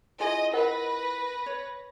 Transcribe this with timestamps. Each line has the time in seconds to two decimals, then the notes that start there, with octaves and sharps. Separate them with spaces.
0.20 E4 F4 G#4 D#5
0.53 A#4 B4 D#5 F#5 A#6
1.46 C#5